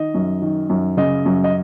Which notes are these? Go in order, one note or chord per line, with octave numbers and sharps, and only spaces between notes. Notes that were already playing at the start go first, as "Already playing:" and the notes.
Already playing: D#3 D#5
F#2
D#3
F#2
C#3 D#5
F#2
D#5